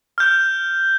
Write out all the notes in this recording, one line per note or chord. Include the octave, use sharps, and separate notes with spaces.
F6 G6